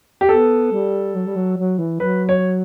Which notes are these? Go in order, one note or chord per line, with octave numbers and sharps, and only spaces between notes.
G4
B3 A4
G3
F#3
G3
F#3
F#3
E3
F#3 B4
C#5